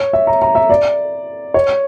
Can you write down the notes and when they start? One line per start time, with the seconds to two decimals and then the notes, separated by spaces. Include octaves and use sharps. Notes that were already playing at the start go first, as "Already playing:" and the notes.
Already playing: C#5
0.13 E5
0.27 A#5
0.42 A#5
0.55 E5
0.70 D5
1.54 C#5